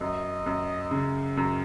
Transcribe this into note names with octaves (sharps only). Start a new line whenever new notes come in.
F#2 D#5
F#2
C#3
F#2